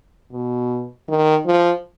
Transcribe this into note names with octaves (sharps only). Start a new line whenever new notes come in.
B2
D#3
F3